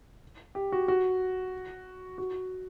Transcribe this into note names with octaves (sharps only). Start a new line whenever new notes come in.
G4
F#4
F#4
F#4